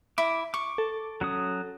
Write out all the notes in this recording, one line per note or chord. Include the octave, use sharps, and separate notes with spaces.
E4 D6
C#6 D6
A4
F#3 C#4 D#6